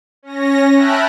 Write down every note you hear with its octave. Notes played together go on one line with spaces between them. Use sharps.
C#4 A#6
E5 G5 A5 B5 F6 F#6